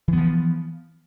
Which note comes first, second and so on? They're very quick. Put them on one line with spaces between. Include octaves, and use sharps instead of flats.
E3 B3 F3